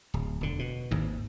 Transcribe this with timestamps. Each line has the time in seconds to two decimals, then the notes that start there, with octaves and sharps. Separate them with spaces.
0.14 D1
0.41 E1 D3
0.59 B2
0.91 G#1 D#2 G#2